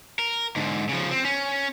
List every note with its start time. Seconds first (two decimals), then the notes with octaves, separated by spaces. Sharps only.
0.19 A#4
0.56 G#2 D3
0.89 C#3 F3
1.11 C4
1.25 C#4